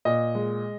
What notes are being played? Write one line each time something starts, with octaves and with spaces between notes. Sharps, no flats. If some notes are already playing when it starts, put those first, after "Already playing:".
A#2 D#5
G#3